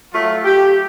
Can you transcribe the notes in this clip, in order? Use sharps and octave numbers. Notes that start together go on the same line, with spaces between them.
F#3 A3 F4
G4